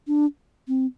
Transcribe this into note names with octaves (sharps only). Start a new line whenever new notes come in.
D4
C4